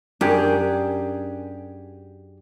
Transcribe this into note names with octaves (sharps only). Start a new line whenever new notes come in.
F#2 D4 G4 G#4